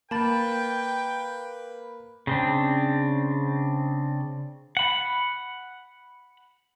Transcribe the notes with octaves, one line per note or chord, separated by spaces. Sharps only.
A#3 B4 G5 A5 B5 A6
C#3 C4 D4
F#5 B5